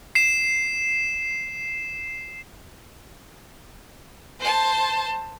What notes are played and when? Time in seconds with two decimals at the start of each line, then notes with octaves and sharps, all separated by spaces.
0.15 C7 E7
4.40 C5 A5